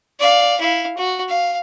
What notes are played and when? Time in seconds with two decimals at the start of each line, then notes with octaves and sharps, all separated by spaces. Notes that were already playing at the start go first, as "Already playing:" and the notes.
0.20 D5 F5
0.60 E4 F5
0.97 F#4
1.28 F5